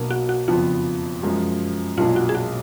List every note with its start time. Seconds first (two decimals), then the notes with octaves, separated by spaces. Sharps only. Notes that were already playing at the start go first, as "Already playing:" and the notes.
Already playing: B1 B2 A#3 D4
0.10 F#4
0.29 F#4
0.47 F#1 F2 F3 B3 D4 F4
1.22 F#2 F3 G#3
1.97 B1 A#2 F#3 D4 F4
2.16 F#4
2.29 G#4
2.35 F#4